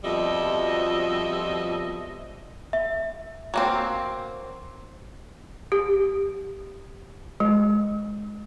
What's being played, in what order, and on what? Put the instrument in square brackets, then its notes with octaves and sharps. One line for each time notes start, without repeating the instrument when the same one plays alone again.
[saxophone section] F2 B2 F3 G3 D#5 E5
[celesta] E5
[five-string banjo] F#3 A#3 C4
[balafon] G4
G#3